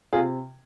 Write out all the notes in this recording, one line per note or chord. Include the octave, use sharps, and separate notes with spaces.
C3 F4 G#4